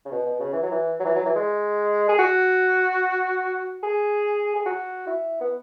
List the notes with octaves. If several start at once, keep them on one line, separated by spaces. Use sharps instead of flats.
C#3
B2
B2
C#3
E3
F#3
E3
F#3
E3
F#3
E3
G#3
G#4
F#4
G#4
G#4
F#4
E4
B3